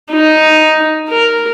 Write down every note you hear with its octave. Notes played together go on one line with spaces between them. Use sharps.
D#4
A#4